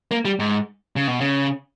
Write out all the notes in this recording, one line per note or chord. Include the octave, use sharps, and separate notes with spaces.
A#3
G3
G#2
C#3
B2
C#3